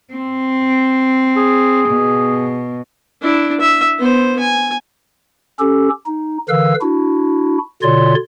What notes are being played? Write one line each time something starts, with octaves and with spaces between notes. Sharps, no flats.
C4
G#4
B2
D4 E4
E5
B3 C5
G#5
C#4 G4 A4
D#4
D3 E3 A#4 B4 F5 E6
D4 E4 F#4
B2 D3 F4 C#5 D5 C6